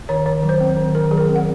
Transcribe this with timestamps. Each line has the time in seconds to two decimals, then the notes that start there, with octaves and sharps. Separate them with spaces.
0.09 D#3 C#5
0.26 D#3 C#5
0.43 F#3
0.49 C5
0.60 C4
0.77 D#3
0.95 D#3 A#4
1.11 F#3 G#4
1.18 A#4
1.29 C4
1.36 F#5